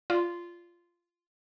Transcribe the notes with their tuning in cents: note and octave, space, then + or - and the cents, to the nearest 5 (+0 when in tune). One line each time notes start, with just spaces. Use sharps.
F4 -10 D5 +0